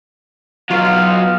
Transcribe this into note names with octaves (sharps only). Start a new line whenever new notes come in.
F#3 B3 F4 F5